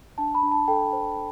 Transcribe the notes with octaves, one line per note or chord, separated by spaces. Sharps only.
D4 A5
B5
D4
A5
A4 G5
C5